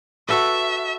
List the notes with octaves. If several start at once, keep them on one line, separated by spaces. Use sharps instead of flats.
F#4 A4 B4 E5